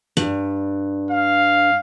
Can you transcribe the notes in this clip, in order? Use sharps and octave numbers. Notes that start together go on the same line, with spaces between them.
G2
F5